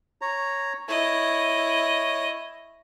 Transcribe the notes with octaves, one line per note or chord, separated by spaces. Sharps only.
C#5 A#5
E4 C#5 D#5